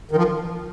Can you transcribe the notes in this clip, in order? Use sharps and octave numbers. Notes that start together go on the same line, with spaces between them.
D#3
F3